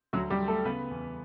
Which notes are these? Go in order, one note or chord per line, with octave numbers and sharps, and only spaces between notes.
D2 F#3 F#4
G3 G4
D2
A3 A4
C#3 B3 B4
E2